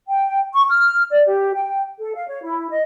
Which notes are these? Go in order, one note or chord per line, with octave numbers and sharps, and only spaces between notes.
G5
C#6
F6
D5
G4
G5
A4
F5
C#5
E4
D#5